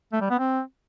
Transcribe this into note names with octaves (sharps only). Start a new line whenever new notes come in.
A3
G3
B3
C4